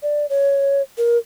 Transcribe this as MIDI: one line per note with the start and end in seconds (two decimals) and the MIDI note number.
0.03 0.26 74
0.30 0.82 73
0.98 1.18 70